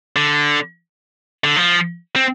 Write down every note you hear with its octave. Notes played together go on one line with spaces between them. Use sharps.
D3
D3
F3
C4